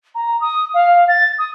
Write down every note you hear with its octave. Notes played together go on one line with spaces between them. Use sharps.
A#5
D#6
F5
A6
D#6